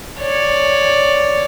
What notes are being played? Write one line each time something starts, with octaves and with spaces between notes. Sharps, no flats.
C#5 D5